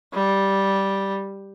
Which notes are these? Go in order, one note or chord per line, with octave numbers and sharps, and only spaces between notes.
G3